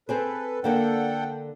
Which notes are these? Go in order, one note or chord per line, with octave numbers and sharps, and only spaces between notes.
C4 G#4 A4 B4 C5
D3 A#3 D4 A4 F#5 G5